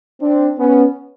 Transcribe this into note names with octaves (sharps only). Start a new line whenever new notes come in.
C4 D4
B3 C#4